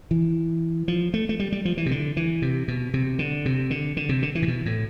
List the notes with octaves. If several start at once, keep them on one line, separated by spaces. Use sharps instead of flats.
E3
F3
A3
A3
G3
G3
F3
E3
C3
D3
E3
C3
B2
C3
D3
C3
D3
D3
C3
D3
E3
A2
B2
A2